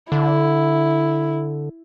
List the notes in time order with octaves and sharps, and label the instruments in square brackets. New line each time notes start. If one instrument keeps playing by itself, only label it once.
[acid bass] D3 [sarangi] E4